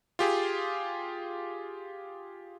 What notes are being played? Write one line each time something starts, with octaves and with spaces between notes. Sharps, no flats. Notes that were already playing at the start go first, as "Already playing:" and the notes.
F4 G4 G#4